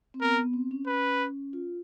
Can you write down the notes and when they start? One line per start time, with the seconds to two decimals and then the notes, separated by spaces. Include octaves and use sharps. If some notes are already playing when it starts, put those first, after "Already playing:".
0.14 C4
0.21 B3 A#4
0.38 B3
0.53 C4
0.71 C#4
0.86 C#4 B4
1.53 F4